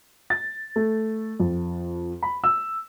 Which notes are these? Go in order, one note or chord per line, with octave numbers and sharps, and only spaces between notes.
A6
A3
F2
B5
E6